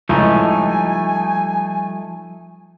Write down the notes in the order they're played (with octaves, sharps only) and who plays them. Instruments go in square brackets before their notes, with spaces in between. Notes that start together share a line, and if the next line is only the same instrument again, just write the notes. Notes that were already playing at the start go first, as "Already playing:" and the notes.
[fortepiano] C#2 A2 [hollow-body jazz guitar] F3 G3 [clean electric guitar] A3 D#4 [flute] G#5